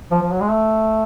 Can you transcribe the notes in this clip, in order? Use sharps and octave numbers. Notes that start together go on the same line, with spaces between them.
F3
F3
F#3
G#3
A3